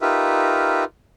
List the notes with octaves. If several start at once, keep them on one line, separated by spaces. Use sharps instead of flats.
D#4 F4 G4 A#4 B4 E5